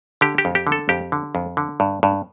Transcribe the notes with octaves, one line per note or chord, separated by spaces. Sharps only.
D3 G4
G4
F2
G4
D3
A4
F2 G4
D3
F2
D3
G2
G2